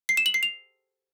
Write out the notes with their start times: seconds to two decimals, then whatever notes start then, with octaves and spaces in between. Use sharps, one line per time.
0.09 C7
0.17 E7
0.26 F#7
0.34 C7
0.43 F7